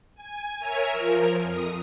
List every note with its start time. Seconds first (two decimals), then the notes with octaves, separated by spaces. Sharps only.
0.15 G#5
0.59 A#4 C#5 E5 G#5 A#5
0.91 F3 A#4
1.41 F2 D#6